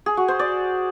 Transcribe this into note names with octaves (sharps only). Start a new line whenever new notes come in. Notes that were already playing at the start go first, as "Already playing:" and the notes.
G#4
F#4
C5
D5